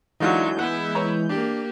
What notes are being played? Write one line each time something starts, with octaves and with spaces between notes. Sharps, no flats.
D3 E3 F#3 G#3 D#4 F4 F#5 G6
B3 E4 F#5
B4 C#5 A#5
A#3 D4 G4